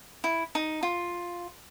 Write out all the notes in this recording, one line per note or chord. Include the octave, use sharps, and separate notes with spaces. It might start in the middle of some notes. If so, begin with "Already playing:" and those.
E4
D#4
F4